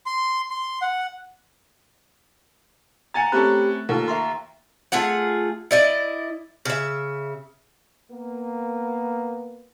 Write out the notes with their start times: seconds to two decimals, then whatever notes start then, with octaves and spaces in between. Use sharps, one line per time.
0.06 C6
0.50 C6
0.82 F#5
3.14 F#5 G#5 A#5 A6
3.32 A3 C4 C#4 G4 A4 B5 F#6
3.89 D#2 F4 A4 A#4
4.08 E5 A#5 C6
4.92 A3 F4 G#4 F#5
5.71 E4 D5 D#5
6.65 C#3 E5
8.11 A#3 B3